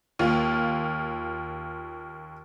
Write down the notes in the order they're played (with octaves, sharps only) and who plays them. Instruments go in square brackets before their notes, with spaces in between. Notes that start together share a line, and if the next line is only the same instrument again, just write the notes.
[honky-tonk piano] D#2 F4